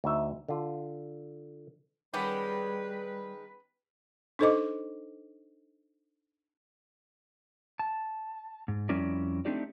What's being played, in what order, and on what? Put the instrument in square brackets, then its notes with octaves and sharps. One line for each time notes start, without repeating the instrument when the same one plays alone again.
[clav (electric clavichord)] D2 D#4 E5
D3 F4
[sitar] D#3 G#3 [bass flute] G3 [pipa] B3 C#4 G4 [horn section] B4
[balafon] D4 D#4 A4 C5 D#5 D6
[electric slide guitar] A5
G#2
F2 G3 C#4 E4 A#4 D5
A3 C4 D4 D#4 G4 D5